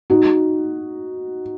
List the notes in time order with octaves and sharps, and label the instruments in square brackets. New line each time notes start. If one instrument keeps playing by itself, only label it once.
[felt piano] D#4 F#4